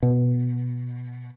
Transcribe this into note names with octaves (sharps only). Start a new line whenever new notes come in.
B2